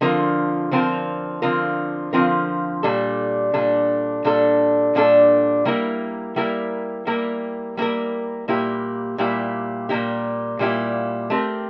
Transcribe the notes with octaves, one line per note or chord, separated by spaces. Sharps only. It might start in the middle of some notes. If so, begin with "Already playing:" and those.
D3 F3 C4 F4 A#4
D3 F3 C4 F4 A#4
D3 F3 C4 F4 A#4
D3 F3 C4 F4 A#4
A#2 G3 D4 A4
A#2 G3 D4 A4
A#2 G3 D4 A4
A#2 G3 D4 A4
G3 A#3 E4 A#4
G3 A#3 E4 A#4
G3 A#3 E4 A#4
G3 A#3 E4 A#4
A#2 G3 A#3 E4 G4
A#2 G3 A#3 E4 G4
A#2 G3 A#3 E4 G4
A#2 G3 A#3 E4 G4
A3 C4 G4 A#4